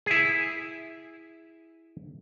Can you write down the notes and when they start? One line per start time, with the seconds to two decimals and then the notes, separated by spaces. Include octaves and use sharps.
0.06 E4 G#4